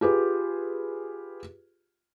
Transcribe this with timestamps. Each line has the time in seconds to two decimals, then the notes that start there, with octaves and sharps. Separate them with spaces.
0.01 F4 G4 G#4 B4